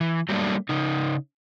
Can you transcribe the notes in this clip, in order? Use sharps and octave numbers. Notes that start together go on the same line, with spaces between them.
E3
F#3 G3 A3 A#3 D4
C#3 D#4